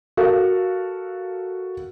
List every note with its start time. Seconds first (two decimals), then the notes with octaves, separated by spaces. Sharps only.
0.17 F#4 A4 A#4 F5